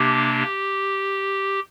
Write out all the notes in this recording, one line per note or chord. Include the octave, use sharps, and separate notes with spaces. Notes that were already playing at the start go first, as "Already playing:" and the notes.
Already playing: C3 A#3 D4 G4